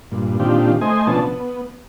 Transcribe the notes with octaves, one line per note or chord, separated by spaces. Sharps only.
G2 A#2
A#2 D#3 C4 D4 F4 G4
A3 C5 D#5 G#5
B2 F3 B3 C#4 D4 A5
B3